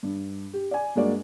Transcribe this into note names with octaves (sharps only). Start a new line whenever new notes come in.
G2
G4
D5 G#5
G2 G#3 A#3 F#4 D5